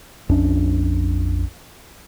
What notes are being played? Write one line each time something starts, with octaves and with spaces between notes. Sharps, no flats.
A#1 F2 C#4 D4